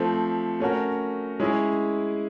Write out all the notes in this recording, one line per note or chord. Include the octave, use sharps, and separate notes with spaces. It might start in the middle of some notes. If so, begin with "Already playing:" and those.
Already playing: F3 A3 C4
A3 C#4 F#4 A#4
G#3 C#4 E4 G#4